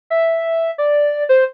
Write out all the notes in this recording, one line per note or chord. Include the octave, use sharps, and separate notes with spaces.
E5
D5
C5